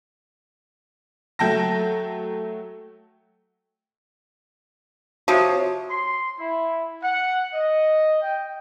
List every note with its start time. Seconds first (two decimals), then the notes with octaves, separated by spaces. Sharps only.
1.39 F#3 A3 G5 A5 A#6
5.28 C3 F3 F#4 C#5 D#6 C#7
5.90 C6
6.39 E4
7.02 F#5
7.53 D#5
8.22 G5